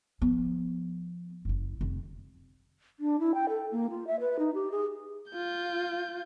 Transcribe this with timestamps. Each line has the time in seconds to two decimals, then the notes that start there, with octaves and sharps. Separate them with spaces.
0.22 F3 B3
1.45 F#1 E4
1.81 F1
3.00 D4
3.20 E4
3.34 G5
3.49 A4
3.72 A#3
3.90 F4
4.07 E5
4.20 B4
4.39 D#4
4.54 G4
4.71 G#4
5.32 F4 G6